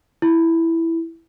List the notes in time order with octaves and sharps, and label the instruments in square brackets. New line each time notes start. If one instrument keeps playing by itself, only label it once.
[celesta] E4